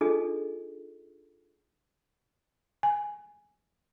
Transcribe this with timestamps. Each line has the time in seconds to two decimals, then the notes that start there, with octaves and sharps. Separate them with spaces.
0.01 D4 D#4 F4 G#4 A4 D#5
2.83 G#5